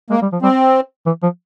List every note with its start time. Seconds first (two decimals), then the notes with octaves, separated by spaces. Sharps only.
0.10 G#3 A#3
0.22 G3
0.33 F3
0.42 G3 C4
1.06 E3
1.23 F3